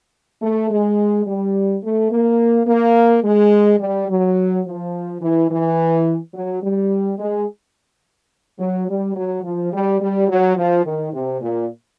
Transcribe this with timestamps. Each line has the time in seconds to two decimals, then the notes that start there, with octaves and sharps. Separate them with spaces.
0.42 A3
0.71 G#3
1.26 G3
1.84 A3
2.11 A#3
2.67 A#3
3.23 G#3
3.80 G3
4.09 F#3
4.66 F3
5.21 E3
5.50 E3
6.34 F#3
6.62 G3
7.18 G#3
8.59 F#3
8.88 G3
9.15 F#3
9.44 F3
9.73 G3
10.00 G3
10.29 F#3
10.57 F3
10.85 D#3
11.13 C3
11.41 A#2